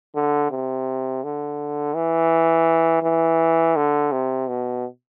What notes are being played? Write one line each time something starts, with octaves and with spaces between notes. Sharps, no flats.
D3
C3
D3
E3
E3
D3
C3
B2